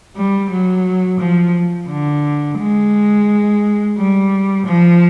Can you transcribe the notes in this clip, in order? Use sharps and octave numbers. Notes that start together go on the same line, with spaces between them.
G3
F#3
F3
D3
G#3
G3
F3